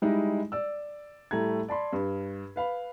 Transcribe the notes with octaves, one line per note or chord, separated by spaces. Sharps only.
G3 G#3 D#4 E4
D5 E6
A2 G3 A3 A#5 G#6
D5 A5 B5 C6
G2
B4 F5 B5